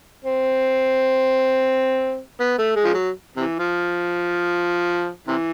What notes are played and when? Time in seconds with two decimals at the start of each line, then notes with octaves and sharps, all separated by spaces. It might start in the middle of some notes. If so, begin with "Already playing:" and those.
0.25 C4
2.40 B3
2.59 A3
2.76 G#3
2.84 F3
2.94 F#3
3.36 C3 E3
3.59 F3
5.27 C3 E3